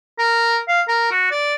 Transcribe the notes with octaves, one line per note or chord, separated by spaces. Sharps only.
A#4
F5
A#4
F#4
D5